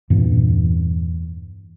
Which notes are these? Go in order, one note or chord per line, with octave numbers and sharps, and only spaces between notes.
E2 G2 A#2 E3